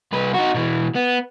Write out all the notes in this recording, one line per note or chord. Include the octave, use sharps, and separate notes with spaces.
C2 B4
D#4 F#4
B2 E3
B3